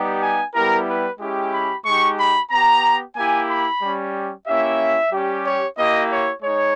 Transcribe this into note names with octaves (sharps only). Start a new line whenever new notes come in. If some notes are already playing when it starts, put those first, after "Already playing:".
Already playing: G3 B3 D#4 G4
G#5
G3 B3 E4 G4 A#4
B4
G#3 C#4 E4 G4
B5
G#3 D#4 G4 C#6
B5
B3 G4 A#5
A#3 E4 G4 G#5
B5
G3 C#4 G4
A#3 C#4 E4 G4 E5
G3 C#4 G4
C#5
A#3 E4 G4 D#5
C#5
G#3 D#4 C#5